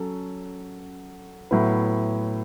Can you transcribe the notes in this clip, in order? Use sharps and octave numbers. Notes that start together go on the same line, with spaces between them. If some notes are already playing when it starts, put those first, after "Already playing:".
Already playing: F#3 C#4 A4
A2 F#3 B3 E4 B4